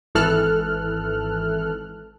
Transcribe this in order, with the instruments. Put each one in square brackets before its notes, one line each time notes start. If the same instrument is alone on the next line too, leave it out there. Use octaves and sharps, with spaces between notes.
[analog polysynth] G#1 E3 A4 F6 F#6